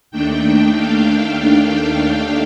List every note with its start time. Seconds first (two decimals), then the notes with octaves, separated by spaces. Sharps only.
0.11 D#2 D#3 A3 D4 G5
0.76 F5